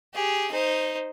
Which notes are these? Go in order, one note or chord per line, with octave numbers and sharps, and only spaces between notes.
G4 G#4
D#4 C5